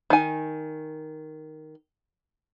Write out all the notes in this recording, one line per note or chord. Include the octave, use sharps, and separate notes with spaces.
D#3 G#5